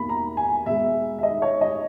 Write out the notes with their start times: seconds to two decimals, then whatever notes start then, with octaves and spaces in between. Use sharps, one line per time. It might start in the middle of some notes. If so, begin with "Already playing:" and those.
Already playing: E2 B2 A#3 B5
0.09 A#5
0.37 G#5
0.66 B2 G#3 E5
1.19 E5
1.23 D#5
1.42 C#5
1.61 D#5